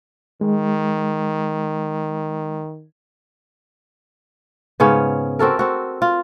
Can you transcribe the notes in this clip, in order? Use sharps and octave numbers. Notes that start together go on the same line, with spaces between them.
D#3 G#3
G#2 C#3 B3 C#4
C4 F#4 A4 A#4
C4 F#4
F4